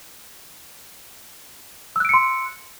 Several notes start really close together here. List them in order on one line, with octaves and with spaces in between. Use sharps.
E6 F#6 D7 C#7 C6